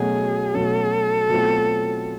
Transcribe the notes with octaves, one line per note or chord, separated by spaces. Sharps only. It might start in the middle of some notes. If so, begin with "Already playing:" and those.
Already playing: B2 F#3 A3 C#4 G#4
B2 F#3 A3 C#4 A4
B2 F#3 A3 C4 F4